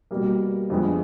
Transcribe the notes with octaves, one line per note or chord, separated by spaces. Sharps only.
B2 G3 A#3
F2 D3 F3 G#3 B3